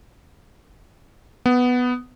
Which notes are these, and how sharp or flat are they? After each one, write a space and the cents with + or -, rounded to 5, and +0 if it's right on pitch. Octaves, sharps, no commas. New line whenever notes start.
B3 +5